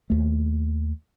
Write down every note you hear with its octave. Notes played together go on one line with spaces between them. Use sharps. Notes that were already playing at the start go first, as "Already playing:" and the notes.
D#2 A3